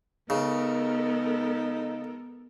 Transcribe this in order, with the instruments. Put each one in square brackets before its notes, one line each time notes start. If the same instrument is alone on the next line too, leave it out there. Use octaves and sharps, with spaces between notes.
[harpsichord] C#3 [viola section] G#3 A4 A#4 [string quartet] B3 [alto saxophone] D#4